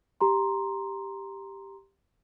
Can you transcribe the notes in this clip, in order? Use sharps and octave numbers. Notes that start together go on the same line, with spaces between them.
G4 A#5 C6